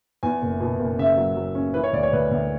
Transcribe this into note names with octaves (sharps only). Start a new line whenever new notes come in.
E2 G#5
F#1
B2
F#1
C#3 E5
F#3
F#3
C#4
E3 B4
C#5
D2 D5
C#5
D2 B4
D2